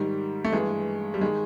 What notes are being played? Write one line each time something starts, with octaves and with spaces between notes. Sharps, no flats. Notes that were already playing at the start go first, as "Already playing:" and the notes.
Already playing: G#2 D#3 G3
A3
G2 E3 G#3
G3
D#3 G#3